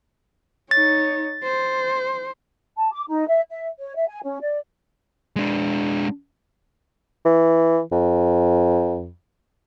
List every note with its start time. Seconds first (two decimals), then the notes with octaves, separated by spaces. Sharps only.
0.71 D#4 C#5 A6
1.43 C5
2.77 A5
2.92 D6
3.08 D#4
3.28 E5
3.50 E5
3.78 C#5
3.96 E5
4.08 G#5
4.24 C#4
4.42 D5
5.36 G#3 D4
7.25 E3
7.92 F2